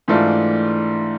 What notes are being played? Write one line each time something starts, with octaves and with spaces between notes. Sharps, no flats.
G#2 E3 A3 D4 F4